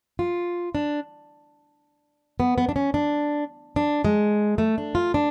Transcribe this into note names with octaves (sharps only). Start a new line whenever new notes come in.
F4
D4
B3
B3
D4
C#4
D4
D4
G#3
A3
D4
F4
D4